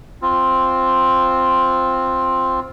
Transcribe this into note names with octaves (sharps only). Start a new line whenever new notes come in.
C4 F4